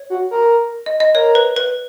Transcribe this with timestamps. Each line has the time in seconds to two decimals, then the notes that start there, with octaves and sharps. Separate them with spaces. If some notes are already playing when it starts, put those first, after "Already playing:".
Already playing: C#5
0.10 F#4
0.31 A#4
0.86 D#5
1.00 D#5
1.14 A#4 C#5
1.35 B4
1.56 B4